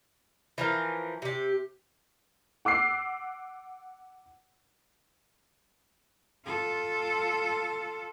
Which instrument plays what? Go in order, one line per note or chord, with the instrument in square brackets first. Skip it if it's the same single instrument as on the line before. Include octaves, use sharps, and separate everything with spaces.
[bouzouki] E3 F3 A#4
C3 G4
[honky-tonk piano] F#5 D6 E6 C7
[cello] F4 A4